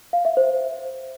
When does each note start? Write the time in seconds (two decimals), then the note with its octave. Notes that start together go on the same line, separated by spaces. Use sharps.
0.13 F5
0.25 E5
0.37 C5